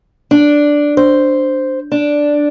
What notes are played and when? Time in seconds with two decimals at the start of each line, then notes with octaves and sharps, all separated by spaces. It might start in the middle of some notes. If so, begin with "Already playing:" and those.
0.31 D4
0.97 C5
1.92 D4